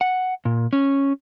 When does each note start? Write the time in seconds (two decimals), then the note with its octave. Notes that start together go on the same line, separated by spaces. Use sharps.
0.01 F#5
0.45 A#2
0.73 C#4